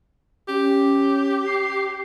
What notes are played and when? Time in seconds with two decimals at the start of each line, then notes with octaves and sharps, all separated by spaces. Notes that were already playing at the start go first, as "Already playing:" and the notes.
0.48 C#4 G4
1.46 C7